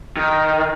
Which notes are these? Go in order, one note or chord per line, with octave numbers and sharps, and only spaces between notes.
D#3